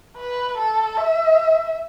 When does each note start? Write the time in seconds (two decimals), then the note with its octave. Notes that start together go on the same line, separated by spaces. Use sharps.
0.17 B4
0.58 A4
0.97 E5